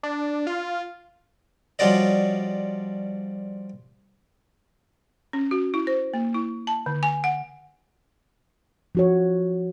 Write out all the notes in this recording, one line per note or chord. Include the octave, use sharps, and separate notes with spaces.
D4
F4
F3 G3 C#4 F#4 D5 D#5
C#4
F#4
E4
C5
A#3
E4
A5
D3
G#5
F#5
F3 F#4 C#5